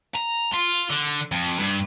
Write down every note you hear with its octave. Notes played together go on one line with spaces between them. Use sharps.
A#5
F4
D3
F2
G2